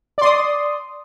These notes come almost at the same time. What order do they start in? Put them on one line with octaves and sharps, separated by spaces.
D5 C6 D#6